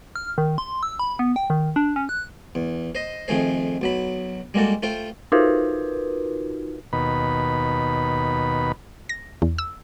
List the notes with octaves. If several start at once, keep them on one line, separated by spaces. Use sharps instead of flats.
F6
D#3
C6
E6
B5
B3
G5
D#3
D4
C#4
F#6
E2
C5 D#5
F2 D#3 A3 G#4 C5
B1 F#3 B5
G3 G#3 A#3 F#4 A4
A3 F4 C5 G5
D#4 F4 F#4 A#4 B4
D#2 B2 B5
A#6
E2
E6